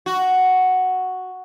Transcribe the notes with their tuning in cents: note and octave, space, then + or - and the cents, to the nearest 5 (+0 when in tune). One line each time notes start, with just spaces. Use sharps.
F#4 +0